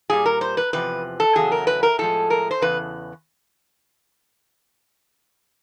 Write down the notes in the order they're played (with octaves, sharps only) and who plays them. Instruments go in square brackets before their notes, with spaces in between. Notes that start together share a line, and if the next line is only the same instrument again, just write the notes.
[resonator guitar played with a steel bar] A#2 G3 G#4
A#4
C5
B4
E2 C3 F3 B4
A4
E2 C#3 F#3 G#4
A#4
B4
A#4
A2 F3 G#3 A4
A#4
C5
E2 C#3 B4